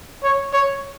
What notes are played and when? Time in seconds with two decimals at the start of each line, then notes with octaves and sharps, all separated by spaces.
0.23 C#5
0.53 C#5